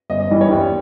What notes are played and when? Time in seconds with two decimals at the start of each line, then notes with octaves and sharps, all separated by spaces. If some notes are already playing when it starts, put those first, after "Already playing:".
0.10 G1 D#5
0.20 D#5
0.30 G2 E3 G3
0.41 C#5
0.51 D#2